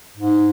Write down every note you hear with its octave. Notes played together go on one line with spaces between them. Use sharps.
G#2